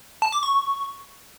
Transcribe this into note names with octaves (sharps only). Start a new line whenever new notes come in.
A5
D6
C#6